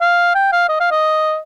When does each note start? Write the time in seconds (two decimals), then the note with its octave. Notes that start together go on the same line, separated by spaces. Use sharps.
0.01 F5
0.35 G5
0.52 F5
0.69 D#5
0.80 F5
0.91 D#5